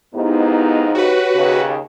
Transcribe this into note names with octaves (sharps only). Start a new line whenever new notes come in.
F2 G#2 B3 D#4 E4 G4
F#4 G4 B4 C#5
D#2 C#3